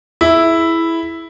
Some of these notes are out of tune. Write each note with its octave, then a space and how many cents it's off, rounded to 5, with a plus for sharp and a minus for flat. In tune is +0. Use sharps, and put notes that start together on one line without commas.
E4 +0 G#4 +25